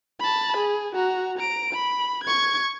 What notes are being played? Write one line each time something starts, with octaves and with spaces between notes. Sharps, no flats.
A5 B5
G#4
F#4 A#5
A#5 D7
B5
C#6 G#6